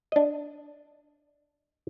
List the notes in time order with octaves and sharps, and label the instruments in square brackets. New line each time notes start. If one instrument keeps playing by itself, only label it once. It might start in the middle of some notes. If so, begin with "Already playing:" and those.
[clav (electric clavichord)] D4 D#5